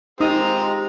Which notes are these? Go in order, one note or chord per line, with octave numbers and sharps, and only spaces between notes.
G#3 C4 D#4 F4 G4 A#5 D#6